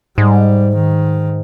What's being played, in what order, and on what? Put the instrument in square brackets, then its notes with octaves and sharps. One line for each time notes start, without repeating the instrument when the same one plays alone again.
[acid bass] G#2 [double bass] G3
[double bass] D#3